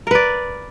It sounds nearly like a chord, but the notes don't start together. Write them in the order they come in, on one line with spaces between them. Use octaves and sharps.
A#4 B4 D5